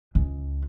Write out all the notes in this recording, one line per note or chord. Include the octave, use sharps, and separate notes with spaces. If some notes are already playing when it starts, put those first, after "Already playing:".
C#2